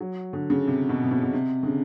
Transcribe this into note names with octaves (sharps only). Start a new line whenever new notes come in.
F#3
D3
C#3
C3
B2
C3
B2
B2
C3
D3
C#3